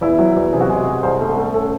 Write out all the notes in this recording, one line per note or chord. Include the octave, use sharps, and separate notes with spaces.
E2 E4
F#3
E2
C3 G#4
F#4
G#3 G#4
C3
C2 C5
A3
A3
C#4 A4